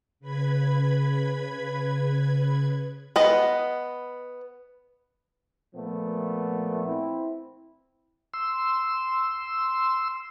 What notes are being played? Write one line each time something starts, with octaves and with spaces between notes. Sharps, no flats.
C#3 B4 B5 G#6
B3 B4 D#5
A#2 F3 A3 B3
C4 E4
C6 E6